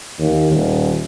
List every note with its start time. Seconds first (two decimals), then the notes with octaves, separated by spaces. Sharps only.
0.19 D#2
0.53 D#1